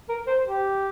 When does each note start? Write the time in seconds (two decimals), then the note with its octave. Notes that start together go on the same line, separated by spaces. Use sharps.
0.09 A#4
0.27 C5
0.44 G4